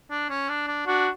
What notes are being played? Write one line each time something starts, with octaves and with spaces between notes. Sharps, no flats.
D4
C#4
D4
D4
D4 F#4